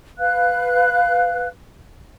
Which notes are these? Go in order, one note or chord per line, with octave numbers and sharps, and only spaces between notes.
B4 F5 F#6